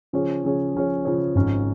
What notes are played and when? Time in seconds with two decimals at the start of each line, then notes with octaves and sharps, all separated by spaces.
0.13 C#3 F3 C#4 G#4 C#5
0.44 C#3 F3 C#4 G#4 C#5
0.75 C#3 F3 C#4 G#4 C#5
1.05 C#3 F3 C#4 G#4 C#5
1.35 G#1 G#2 F3 C#4